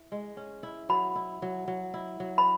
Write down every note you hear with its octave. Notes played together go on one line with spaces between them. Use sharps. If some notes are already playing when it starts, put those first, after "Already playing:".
Already playing: E4
G#3
C#4
E4
F#3 B5
E4
F#3
F#3
E4
F#3
B5